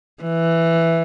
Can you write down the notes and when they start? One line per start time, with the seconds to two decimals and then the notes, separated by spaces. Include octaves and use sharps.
0.23 E3